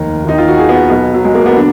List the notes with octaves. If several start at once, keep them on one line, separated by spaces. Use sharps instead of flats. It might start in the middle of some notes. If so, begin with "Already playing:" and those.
Already playing: F1 D#2 D#3 A#4
D#2 D#3 D#4
F4
F#4
G#4
B3
B1 B2 B3
F#3
G#3
A#3
B3
D3 D4